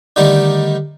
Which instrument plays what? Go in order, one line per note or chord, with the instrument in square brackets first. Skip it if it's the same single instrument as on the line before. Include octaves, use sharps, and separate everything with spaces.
[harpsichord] D3 D#3 G3 A3 D#4